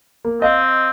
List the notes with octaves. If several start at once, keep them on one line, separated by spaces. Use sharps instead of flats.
A#3
C4 D#5 F5